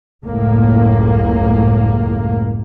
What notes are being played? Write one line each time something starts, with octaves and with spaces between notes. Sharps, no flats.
F#1 C#2 A2 A#3